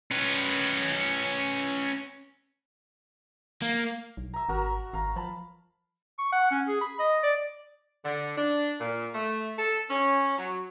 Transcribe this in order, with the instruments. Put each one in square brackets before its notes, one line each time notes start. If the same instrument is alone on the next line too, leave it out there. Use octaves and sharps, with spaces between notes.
[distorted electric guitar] C#4 B4
[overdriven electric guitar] A#3
[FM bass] B1
[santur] E5 A#5
[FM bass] G#1 [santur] F#4 A#4 A#5
[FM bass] G#1 [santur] F5 A#5
[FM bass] F3 [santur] A5 B5
[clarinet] C#6
F#5
C#4
G#4
B5
D#5
D5
[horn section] D3
D4
A#2
A3
A4
C#4
F#3